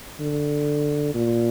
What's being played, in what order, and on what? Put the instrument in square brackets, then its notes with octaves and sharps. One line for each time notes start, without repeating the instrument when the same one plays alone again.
[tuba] D3
A#2